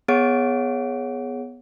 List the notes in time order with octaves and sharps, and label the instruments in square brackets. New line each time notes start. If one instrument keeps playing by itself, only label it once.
[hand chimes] B3 G#4 C#5 F#5 D7